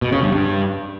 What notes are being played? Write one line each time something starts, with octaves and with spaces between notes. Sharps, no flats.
B2
C#3
G2
G2